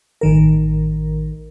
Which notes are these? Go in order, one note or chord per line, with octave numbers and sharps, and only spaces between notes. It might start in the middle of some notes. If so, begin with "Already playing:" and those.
A1 D#3 A#4